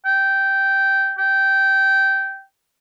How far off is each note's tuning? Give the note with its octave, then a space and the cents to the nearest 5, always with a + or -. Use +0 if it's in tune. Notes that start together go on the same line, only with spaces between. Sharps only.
G5 -10
G5 -15